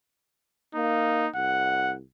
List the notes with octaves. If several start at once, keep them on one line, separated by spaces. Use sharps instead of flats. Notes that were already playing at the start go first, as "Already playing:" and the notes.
A#3 D#4
C2 F#5